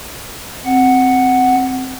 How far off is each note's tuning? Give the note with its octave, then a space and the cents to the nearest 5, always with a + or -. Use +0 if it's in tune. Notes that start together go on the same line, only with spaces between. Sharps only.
C4 +0 F#5 +0